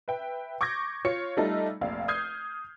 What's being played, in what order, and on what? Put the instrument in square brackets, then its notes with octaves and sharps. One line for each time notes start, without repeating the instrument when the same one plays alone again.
[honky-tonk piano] B4 E5 G5
C#6 D6 G6 G#6 A#6
F4 C#5 C#7
G3 A3 D#4 F4 A4
F1 A#1 F5
D#6 F6 G6 G#6 C7